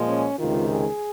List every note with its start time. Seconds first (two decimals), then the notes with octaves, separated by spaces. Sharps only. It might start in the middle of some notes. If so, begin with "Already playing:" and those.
Already playing: A#2 F3 G#3
0.09 C#4
0.38 C#2 C3 D#3 F4
0.68 G#4